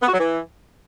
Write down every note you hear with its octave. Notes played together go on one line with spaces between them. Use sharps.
B3
F#4
F#3
E3